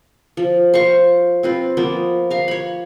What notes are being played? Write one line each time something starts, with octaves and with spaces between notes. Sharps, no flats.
F3
C5 F5 C#6
C4 F4 B4
F3 A#3 B3
F5 A#5
C#5 B5